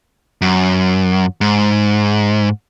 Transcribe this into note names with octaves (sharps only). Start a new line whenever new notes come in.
F#2
G#2